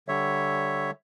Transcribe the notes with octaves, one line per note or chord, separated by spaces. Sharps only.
D3 G3 C#5 E5